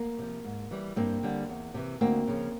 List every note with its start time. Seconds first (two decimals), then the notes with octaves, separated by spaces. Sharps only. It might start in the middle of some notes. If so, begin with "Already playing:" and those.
Already playing: A#3
0.18 C3 F3
0.45 G#2
0.71 E3 G3
0.96 G2 A#3 C4
1.23 D3 G3
1.49 E2
1.74 C3 E3
2.01 D2 A#3 C4
2.28 C#3 F3